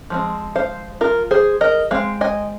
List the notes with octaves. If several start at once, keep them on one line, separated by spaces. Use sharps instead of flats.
F3 G#3 C4
C5 F5
F4 A#4
G#4 C5
A#4 D#5
G#3 C4 F5
D#5 G#5